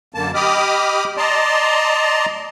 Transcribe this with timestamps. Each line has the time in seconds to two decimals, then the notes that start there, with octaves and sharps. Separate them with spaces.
0.14 F#2 D3 A#3 A5
0.34 G4 D#5 B5 D6 D#6 F6
1.17 D5 D#5 A5 A#5 C6